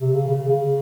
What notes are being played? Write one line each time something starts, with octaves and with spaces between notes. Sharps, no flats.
C3
C#3
C#3
C#3